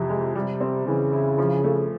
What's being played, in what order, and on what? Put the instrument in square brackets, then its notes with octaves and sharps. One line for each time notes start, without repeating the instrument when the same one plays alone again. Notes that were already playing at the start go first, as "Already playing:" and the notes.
Already playing: [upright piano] F2 E3 [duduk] C3
[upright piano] G#3
[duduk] C3 [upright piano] G3
[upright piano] C4
[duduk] C#3 [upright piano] E3
[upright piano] E4
F3
A3